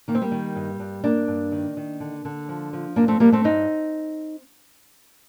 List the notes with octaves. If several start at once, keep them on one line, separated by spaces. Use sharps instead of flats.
D#3 A#3
C4
G3 A#3
D#3
G2
G2
G2 A#3 D4
G2
D#3
D#3
D3
D3
F3
F3
G2 A#3 D4
A3 C4
G2 G3 A#3
A3 C4
G2 C4 D#4